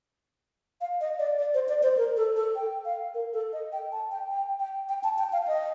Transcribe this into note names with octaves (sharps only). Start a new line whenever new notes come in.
F5
D#5
D5
D5
C5
D5
C5
A#4
A4
A4
G5
F5
A#4
A4
D#5
G5
A5
G5
G5
G5
G5
A5
G5
F5
D#5